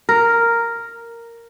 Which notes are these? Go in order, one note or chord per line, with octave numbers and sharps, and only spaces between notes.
A#4